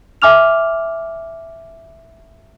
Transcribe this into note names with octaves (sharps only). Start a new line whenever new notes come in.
E5 G#5 D6 F6 F7